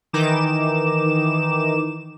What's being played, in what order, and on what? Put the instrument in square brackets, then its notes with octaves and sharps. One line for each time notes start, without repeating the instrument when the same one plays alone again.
[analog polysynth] D#3 E3 D#4 D6 E7